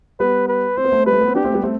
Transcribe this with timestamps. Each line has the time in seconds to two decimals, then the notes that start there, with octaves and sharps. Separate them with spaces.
0.20 G3 B3 B4
0.48 B4
0.77 C4 C5
0.85 B3
0.92 A3 C4
1.06 G3 B4
1.13 A3
1.21 B3
1.28 C4
1.35 B3 D4 G4
1.44 A3 C4
1.54 G3 B3
1.63 A3 C4